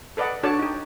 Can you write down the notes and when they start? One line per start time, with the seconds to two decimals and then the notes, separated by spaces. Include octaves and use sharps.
0.17 A4 B4 D5 D#5 F#5
0.43 D4 F#4 A4 C#5 D5 A5
0.59 D#4 G4